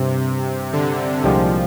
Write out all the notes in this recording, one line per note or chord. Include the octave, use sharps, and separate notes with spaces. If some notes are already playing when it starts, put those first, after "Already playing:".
Already playing: G2 C3
D3
C2 A#2 F3 G#3 D4 G4